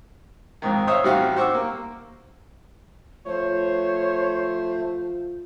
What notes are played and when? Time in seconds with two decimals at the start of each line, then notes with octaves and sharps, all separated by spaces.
0.62 F2 G#2 D#3
0.87 C5 C#5 E5 F5 D#6
1.04 A1 G3 C4 F#4 G4 F5
1.36 C5 F#5 C#6 D6 E6
1.54 A#3
3.26 F3 A3 C5 C#5